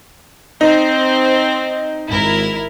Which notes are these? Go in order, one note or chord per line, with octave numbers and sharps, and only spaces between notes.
C4 D#4 C5
G#1 E4 A#4